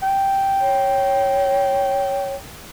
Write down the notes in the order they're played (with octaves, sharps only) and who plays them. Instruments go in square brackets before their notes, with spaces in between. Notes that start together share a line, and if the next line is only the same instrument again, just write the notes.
[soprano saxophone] G5
[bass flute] C#5